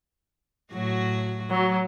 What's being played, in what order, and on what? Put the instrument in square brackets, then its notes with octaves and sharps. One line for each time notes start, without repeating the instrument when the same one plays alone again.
[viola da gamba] A2 F#3 F#4
[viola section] F#3